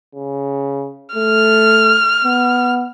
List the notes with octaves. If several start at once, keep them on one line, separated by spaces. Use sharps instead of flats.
C#3
A3 F6
B3